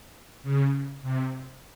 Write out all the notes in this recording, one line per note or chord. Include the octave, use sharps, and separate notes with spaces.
C#3
C3